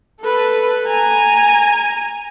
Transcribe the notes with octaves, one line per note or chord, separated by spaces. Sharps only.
A4 B4
G#5 A#5